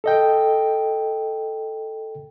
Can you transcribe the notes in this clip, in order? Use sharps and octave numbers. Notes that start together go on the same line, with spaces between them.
A4 D#5 G5